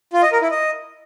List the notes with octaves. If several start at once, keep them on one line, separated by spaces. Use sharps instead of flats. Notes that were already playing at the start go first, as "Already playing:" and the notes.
F4
D#5
A#4
E4
D#5